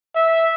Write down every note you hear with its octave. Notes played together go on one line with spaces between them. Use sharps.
E5